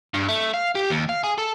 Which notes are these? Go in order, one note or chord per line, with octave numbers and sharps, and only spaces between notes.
G2
A3
F5
G4
D#2
F5
G#4
A4